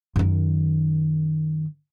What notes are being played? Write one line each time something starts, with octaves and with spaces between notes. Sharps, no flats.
F#2 D#3